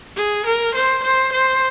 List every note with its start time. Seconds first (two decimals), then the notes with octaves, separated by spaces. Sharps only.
0.16 G#4
0.46 A#4
0.75 C5
1.04 C5
1.32 C5